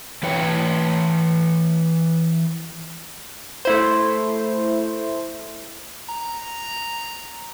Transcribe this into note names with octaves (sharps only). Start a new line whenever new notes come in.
E3 B4 C#5 G5
A3 E4 C5
A#5